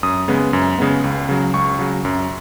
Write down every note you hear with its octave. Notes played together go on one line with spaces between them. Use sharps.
F#2 D#6
C#3 G#3 B3
F#2
C#3 G#3 B3
C#2
C#3 F#3
C#2 C#6
C#3 F#3
F#2